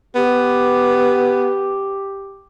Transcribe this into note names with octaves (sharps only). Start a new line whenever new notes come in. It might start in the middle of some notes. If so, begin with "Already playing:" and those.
B3 G4